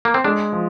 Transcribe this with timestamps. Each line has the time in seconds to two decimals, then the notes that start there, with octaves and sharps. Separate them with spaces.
0.05 A#3
0.14 C4
0.24 G#3 D4
0.52 F3